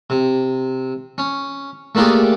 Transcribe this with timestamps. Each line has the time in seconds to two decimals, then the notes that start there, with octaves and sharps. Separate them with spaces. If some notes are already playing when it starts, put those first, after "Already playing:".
0.10 C3
1.18 C#4
1.95 A3 A#3 D4 F4 G4 G#4